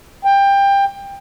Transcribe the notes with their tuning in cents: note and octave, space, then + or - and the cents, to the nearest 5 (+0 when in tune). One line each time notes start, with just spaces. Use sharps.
G5 +20